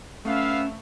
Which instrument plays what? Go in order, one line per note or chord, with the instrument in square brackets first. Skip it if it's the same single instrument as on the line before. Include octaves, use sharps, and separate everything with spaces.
[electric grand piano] A3 [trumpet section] B3 E5 F5 [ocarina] C#4